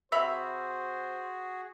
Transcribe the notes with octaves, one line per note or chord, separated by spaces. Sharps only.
C3 F#4 G#4 C5 E5 B5 E6 F7